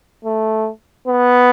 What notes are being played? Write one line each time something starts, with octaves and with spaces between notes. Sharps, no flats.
A3
B3